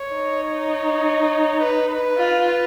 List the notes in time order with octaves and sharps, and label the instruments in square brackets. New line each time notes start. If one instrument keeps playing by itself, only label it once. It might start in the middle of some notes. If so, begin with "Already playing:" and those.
Already playing: [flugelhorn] C#5
[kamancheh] D#4
[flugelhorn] C#5
C#5
B4
B4
[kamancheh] F4